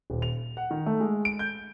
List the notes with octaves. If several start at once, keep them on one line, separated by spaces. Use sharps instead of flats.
D#1
F7
F#5
D#3
A3
G#3
D7
G6